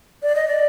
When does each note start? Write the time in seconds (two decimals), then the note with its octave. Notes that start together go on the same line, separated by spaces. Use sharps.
0.23 D5
0.36 D#5
0.48 D5